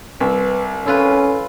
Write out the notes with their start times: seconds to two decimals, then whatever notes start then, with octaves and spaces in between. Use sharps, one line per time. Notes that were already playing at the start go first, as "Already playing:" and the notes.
0.20 C2 B4 E5
0.86 C#4 E4 F4 A4 B4